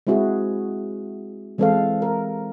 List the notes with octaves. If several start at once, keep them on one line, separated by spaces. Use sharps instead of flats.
G#3 C4 E4 F#4 G#4
E3 G#3 C4 A4 B4 F5
A#4